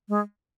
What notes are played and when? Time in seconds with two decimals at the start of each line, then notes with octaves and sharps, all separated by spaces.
0.09 G#3